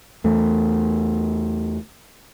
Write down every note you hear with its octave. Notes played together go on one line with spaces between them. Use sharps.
E2 A3